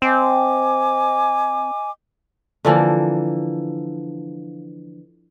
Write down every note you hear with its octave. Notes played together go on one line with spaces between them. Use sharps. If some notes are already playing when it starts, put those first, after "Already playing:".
C4 D#5 G#5 D6
D3 E3 F3 A#3